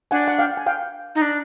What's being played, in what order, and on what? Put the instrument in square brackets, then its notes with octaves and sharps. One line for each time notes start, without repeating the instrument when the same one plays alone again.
[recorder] D4 [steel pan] F#5 G#5
[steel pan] F#5
F5 G5
G#5
F5 G5
[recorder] D#4
D4